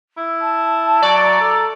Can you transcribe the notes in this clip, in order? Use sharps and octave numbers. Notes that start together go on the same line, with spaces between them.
E4
A5
F#3 D5
A#5
A4